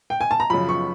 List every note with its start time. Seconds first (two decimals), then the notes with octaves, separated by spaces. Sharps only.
0.10 G5
0.21 G#5
0.31 A5
0.40 A#5
0.50 F#2 C#3 F3 B5
0.69 C#6